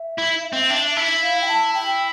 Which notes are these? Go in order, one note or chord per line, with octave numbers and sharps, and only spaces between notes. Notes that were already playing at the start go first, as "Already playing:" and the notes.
Already playing: E5
E4
C4
D4
E4
F5
G5
A5
G5